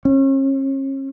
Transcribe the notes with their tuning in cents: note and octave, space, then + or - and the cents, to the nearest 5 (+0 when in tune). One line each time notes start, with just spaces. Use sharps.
C#4 -40